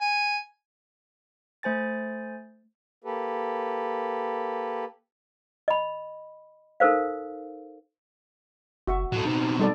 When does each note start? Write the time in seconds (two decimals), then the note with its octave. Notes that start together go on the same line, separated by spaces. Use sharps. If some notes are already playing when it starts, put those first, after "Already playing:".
0.01 G#5
1.63 A3 C5 G#5 A6
3.04 A#3 G4 A4 B4
5.68 D#5 B5
6.80 D#4 A4 A#4 C5 F5
8.87 F#1 F#4 E5 C#6
9.12 A2 F#3 A4
9.25 B2 C4 D#4
9.59 G3 D#4 A4 D5